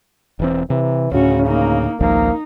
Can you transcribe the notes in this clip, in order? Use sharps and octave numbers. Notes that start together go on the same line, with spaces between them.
E1 E3 C4
C3 E3
D2 A2 C#3 C#4 F#4
A#3 D#4
G#1 C#2 F3 A#3 D#4